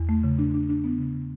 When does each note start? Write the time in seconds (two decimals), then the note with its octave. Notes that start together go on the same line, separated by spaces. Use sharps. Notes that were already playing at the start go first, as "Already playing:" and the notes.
Already playing: E2
0.09 A3
0.23 C#3
0.38 D4
0.54 D4
0.69 D4
0.84 B3
0.99 C#3
1.14 C#3